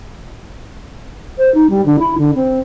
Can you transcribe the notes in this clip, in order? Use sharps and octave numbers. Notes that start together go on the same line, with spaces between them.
C5
D#4
G3
D3
E4
D3
C4